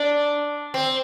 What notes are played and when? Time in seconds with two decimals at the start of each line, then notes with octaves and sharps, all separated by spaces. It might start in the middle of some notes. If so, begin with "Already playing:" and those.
Already playing: D4
0.74 C4